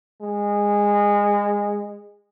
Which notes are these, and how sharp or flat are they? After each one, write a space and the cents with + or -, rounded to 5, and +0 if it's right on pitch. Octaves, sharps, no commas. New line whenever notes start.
G#3 -20